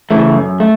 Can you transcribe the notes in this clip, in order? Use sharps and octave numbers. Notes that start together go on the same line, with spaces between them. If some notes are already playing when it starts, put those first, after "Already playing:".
C#3 E3 A3
F#2
A3